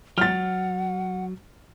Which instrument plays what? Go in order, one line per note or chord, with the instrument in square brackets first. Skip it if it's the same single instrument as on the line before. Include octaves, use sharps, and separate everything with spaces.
[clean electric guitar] F#3 [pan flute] F#5 [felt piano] F6 A6